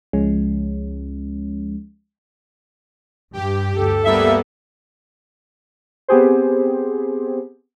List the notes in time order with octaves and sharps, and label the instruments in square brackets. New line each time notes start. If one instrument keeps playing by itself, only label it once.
[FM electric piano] C#2 F3 G#3 C#4
[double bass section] G2 [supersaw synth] G4
[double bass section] D2 G2 [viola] A4
[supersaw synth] G3 A#3 B3 [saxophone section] E5
[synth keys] B3 C4 G4 G#4 C5